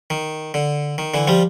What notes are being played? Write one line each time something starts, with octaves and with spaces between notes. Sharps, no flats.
D#3
D3
D#3
D3 E3
F3 G3